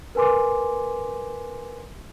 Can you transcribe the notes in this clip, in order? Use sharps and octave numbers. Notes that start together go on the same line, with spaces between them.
A#4 B4 G#5 C6 D6